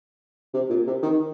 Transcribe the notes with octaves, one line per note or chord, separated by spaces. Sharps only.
C3
A#2
C3
D#3